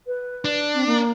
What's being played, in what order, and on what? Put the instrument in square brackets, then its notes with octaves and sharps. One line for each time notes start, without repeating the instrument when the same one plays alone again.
[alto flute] B4
[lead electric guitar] D4
[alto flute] C4
A#3